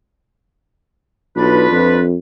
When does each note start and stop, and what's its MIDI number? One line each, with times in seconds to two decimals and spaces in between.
1.37 1.69 35
1.37 2.03 62
1.37 2.03 65
1.37 2.03 71
1.71 2.16 41